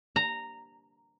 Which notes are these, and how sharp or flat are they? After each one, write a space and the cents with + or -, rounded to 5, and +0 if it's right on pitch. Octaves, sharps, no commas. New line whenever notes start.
A#5 -10